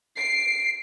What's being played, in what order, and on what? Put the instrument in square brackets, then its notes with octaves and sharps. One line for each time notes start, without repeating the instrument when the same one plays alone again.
[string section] C7 [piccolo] D7